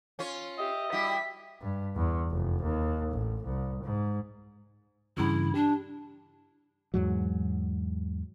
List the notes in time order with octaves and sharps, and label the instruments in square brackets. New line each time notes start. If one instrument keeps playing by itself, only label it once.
[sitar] C#4 F4 C#5
[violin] G4 [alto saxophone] D#5 [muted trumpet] E5
[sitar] G3 E4 F#4 [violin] B6
[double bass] G2
E2
F1
D#2
A1
C2
G#2
[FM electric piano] G2 C#3 E3 [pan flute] E4
[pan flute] D4 [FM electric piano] G4
[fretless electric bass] E2 G#2 F#3